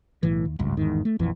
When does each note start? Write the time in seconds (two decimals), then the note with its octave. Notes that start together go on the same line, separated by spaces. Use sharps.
0.23 B1 A2 E3
0.45 D#2
0.59 G#1 C#2 G2
0.77 G1 E2 G#2 D#3
1.05 A3
1.19 A#1 F2 E3